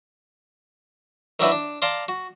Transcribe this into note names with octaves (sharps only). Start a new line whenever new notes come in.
D#3 F#3 D4 E4 F#4 B4
D4
D5 F5 A5 A#5 C6 D6
F#4